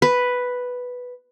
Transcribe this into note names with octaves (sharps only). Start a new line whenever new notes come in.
B4